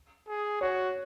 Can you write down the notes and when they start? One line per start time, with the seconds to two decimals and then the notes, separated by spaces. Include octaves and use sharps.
0.27 G#4
0.61 F#4 C#5